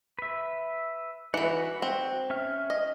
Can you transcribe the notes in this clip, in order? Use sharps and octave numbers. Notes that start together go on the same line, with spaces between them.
B4 E5
E3 F#4 B4 F#5
C4
C#4 E5 F6
D#5